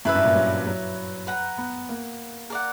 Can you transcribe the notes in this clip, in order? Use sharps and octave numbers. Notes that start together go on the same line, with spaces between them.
F#2 E4 B4 E5
G2
A#2
F#3
F#3
B4 F#5 A#5
B3
A#3
A#4 D5 F#5